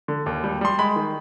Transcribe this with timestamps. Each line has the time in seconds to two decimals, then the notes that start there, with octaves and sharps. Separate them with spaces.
0.08 D3
0.26 D#2
0.44 G3
0.61 G3 C6
0.79 G#3 B5
0.96 D#3